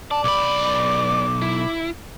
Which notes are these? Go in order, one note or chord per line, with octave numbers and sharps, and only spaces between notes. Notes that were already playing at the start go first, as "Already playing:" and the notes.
D5 A5
B1 B5 D6
E4